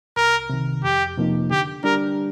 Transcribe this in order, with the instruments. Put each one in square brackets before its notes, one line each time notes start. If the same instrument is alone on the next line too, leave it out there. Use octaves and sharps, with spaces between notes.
[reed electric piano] C2 [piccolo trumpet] A#4
[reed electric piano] C3 D#3
[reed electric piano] F2 [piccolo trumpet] G4
[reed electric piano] C3 F3 A#3 D#4
[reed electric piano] D3 [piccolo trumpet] G4
[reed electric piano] G3 D4 G4 [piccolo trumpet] A#4